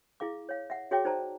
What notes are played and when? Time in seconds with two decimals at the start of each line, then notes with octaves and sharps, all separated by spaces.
0.20 E4 G#4 F5 D6
0.49 C#5 F5
0.70 E5 F#5
0.91 F#4 G#4 C#5 E5 G5 D6
1.05 D#4 C5 D5 A5 A#5